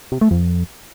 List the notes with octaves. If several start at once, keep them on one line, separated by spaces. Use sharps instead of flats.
C3
A3
F2